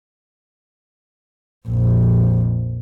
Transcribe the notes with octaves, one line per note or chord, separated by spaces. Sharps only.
A#1 F2